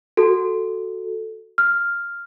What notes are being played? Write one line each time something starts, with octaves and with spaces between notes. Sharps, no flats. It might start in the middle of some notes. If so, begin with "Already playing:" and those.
F#4 A4
F6